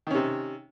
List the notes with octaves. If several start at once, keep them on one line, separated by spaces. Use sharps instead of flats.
C3 D#3 C#4